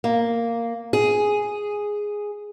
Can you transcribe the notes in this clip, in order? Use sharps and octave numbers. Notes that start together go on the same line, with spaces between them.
A#3
G#4